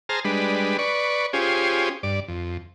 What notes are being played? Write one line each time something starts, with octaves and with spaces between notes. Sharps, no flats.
G#4 C5 A5 A#5 F6
G3 G#3 D4 B4
B4 D5 C#6
C#4 F4 G4 G#4 C5
G2 D5
F2